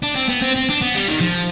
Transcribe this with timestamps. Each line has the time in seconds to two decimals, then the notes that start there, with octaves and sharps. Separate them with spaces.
0.03 D4
0.16 C4
0.29 B3
0.42 C4
0.56 C4
0.69 D4
0.82 B3
0.95 G3
1.08 D#3
1.21 F3